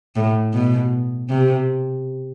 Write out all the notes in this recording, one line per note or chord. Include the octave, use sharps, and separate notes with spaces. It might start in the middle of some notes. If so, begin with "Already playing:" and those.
A2
B2
C3